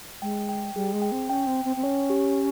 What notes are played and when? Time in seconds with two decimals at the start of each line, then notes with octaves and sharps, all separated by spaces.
0.22 G#3 G5
0.49 G5
0.75 G3 G#4
0.93 G#3
1.02 G5
1.12 C4
1.29 C#4 G5
1.47 C4
1.57 G5
1.65 C4
1.76 C4
1.83 C#4 C#5
2.10 G4